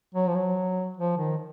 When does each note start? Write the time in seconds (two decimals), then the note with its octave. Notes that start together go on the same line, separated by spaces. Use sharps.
0.14 F#3
0.28 F3
0.35 F#3
0.97 F3
1.17 D#3